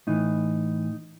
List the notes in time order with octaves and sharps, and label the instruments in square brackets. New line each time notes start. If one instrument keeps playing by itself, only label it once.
[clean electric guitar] A2 E3 D#4